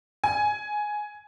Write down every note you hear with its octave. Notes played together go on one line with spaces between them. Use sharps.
G#5